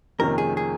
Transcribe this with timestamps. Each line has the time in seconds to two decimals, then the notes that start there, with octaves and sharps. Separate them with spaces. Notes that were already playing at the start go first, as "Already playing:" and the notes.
0.19 F2 C3 D#3 A#3 C#4 A#4
0.38 G#4
0.57 G#4